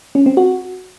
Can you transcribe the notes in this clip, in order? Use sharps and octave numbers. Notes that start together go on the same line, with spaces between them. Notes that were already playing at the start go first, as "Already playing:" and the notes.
C#4
C4
F#4